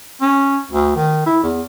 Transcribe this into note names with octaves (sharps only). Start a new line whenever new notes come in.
C#4
D2
D#3
E4
E2